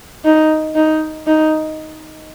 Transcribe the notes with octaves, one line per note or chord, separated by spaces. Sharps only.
D#4
D#4
D#4